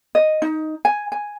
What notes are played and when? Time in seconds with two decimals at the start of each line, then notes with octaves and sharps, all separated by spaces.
0.15 D#5
0.42 D#4
0.85 G#5
1.12 G#5